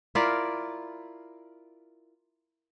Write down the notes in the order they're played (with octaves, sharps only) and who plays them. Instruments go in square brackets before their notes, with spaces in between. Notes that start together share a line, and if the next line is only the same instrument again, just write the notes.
[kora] E4 F4 A#4 D5